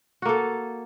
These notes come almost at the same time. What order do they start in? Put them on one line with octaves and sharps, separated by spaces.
F#4 A#3 A4